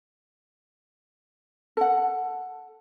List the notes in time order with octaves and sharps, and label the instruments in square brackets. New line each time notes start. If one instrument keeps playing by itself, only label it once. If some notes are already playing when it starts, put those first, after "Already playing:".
[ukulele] A4 F#5